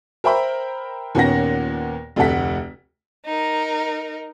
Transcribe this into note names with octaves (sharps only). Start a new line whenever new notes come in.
A#4 C5 E5 G5 A#5 B5
D#2 A#2 B3 C#4 F#5 A#6
F1 D2 C3 A4 F#5 B6
D#4 A#4